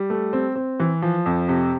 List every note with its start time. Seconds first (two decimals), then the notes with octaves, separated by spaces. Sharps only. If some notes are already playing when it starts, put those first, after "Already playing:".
Already playing: G3
0.10 A3
0.33 C4
0.55 C4
0.80 E3
1.02 F3
1.26 F2
1.48 C3